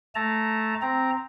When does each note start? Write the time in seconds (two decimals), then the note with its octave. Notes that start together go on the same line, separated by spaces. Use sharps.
0.15 A3 A5 A#5
0.82 C4 A#5